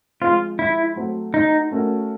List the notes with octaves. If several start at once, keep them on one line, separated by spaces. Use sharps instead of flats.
F3 G#3 C4 F4
E4
F#3 A3 C4
D#4
A3 C#4 F#4 A#4